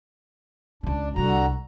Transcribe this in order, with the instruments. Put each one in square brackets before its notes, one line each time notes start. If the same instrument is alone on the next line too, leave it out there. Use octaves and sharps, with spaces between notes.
[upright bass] C#2 C#3 [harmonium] D4
[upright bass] C2 G3 [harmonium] D3 F#4 A#5